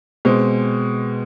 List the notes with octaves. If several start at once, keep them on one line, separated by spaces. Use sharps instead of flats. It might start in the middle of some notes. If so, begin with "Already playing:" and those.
B2 G#3 C4